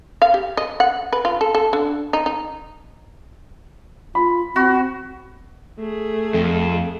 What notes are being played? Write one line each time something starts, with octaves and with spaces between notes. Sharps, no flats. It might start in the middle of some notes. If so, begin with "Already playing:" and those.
F5
G4
D#5
F#5
B4
F4
A4
A4
D3
D#4
D#4
F4 B5
C4 F#4
A3 G#4
F2